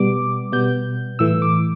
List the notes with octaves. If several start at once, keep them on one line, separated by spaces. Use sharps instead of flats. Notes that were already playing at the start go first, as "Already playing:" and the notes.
Already playing: B2 G3 B3 D6
B2 G3 B3 G6
A2 E3 A3 E6
D6